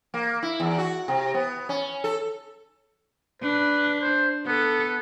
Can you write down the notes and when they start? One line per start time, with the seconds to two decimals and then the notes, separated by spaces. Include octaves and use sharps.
0.14 A#3
0.42 E4
0.60 E2
0.78 F#4
1.08 C3
1.34 B3
1.69 C#4
2.04 A4
3.42 D4 B4
4.01 C5
4.47 B3 A4